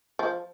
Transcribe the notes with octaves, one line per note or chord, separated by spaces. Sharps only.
F3